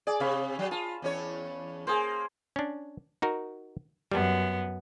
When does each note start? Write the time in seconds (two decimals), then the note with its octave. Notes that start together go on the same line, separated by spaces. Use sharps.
0.07 G#4 D5
0.20 C3 F5 B5 C#6
0.59 F#3
0.71 F4 A5
1.02 E2 C#4 C#5
1.87 A#3 G#4 C5
2.56 C#4 D4
3.22 D#4 F#4 A#4
4.12 F#2 G3 B3